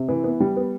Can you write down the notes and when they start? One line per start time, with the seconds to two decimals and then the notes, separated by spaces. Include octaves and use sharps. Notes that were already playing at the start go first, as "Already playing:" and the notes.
Already playing: C3
0.08 E3
0.24 B3
0.40 G3
0.57 B3